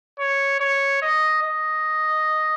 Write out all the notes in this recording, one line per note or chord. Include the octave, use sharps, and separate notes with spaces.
C#5
C#5
D#5
D#5